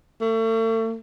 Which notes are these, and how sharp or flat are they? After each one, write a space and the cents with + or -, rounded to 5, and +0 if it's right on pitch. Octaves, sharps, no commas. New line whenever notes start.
A3 +40